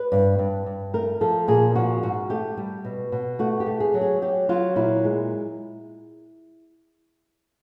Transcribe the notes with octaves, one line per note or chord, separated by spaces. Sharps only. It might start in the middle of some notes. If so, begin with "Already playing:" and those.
Already playing: B4
G2
G2
G2
A3 A#4
F3 A4
A#2 G#4
F3 F#4
G#2 F#4
A3 G4
G3
B2
B2
A3 F#4
G4
A3
G#4
F#3
G#4
F#3 G4
F#3 F4
A#2 E4
G#3